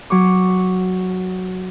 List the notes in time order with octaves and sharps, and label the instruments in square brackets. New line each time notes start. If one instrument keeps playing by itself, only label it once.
[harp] F#3 C#6 D6